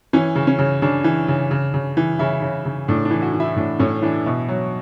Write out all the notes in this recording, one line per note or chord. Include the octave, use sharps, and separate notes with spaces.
E3 C#4
C#3
C#4
C#3
C#3 D4
E3
C#3
C#3
C#3
E3
C#3 E4
C#3
C#3
A2 D4
D4
E3
F#4
E3
E4
A2 D4
A2 C#4
E3 D4
B2 E4
F#3